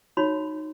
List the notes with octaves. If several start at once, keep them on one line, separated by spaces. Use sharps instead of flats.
D#4 F#4 C#5 B5